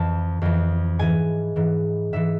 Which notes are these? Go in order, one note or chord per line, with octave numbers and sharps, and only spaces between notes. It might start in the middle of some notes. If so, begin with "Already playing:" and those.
Already playing: F2 E3 A5
F2 E3
G#2 E3 G#5
G#2 E3
G#2 E3 E5